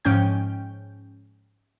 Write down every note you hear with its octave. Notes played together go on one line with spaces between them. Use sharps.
G#2 F3 C#4 G5 G6